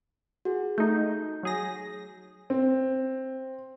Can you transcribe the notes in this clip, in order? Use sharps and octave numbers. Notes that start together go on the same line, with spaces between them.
F#4 G#4
A3 D#4 G6
F#3 G#4 A#6
C4